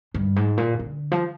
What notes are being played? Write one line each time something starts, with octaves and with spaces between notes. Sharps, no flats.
G2
G#2
A#2
D3
F3